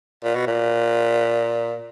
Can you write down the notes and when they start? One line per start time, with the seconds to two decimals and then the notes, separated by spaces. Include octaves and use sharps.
0.24 A#2
0.35 B2
0.47 A#2